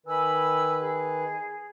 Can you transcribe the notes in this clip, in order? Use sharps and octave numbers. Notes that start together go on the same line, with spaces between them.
D#3 B4 G#5 B5 E6
G#4